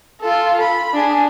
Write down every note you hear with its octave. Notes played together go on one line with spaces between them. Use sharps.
F4 A4
B5
D4 G#4